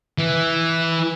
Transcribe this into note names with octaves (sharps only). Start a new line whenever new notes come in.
E3